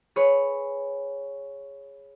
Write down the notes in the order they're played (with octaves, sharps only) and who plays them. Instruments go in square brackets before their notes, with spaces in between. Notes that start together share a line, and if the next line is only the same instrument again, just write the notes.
[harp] G#4 B4 C#5